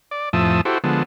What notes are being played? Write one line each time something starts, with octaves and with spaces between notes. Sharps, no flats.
D5
F2 A2 F3 E5 A5 D#6
E4 F#4 G4 A4 C5
D3 F3 G#3 B3 A4